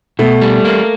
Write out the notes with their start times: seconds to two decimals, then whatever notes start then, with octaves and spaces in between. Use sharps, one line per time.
0.19 B2 A3
0.41 G3
0.65 A#3